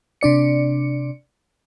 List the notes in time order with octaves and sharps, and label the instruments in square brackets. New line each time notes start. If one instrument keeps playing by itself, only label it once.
[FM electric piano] C3 D4 D5 C#7